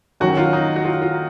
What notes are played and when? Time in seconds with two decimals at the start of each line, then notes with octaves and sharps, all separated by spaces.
0.20 F#2 D#3 F#3 C#4 F#4
0.37 F4
0.53 D#4
0.76 F#4
0.85 F4
1.02 F4